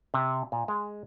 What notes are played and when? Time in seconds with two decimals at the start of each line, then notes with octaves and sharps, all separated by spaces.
0.14 C3
0.52 A#2
0.68 G#3